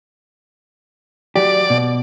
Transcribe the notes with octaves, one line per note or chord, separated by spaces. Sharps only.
F#3 G4 D5
B2